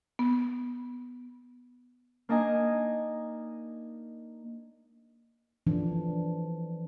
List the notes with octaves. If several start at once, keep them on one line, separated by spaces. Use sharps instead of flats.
B3
A#3 D4 D#4 D#5 G#5
E3 F3 D4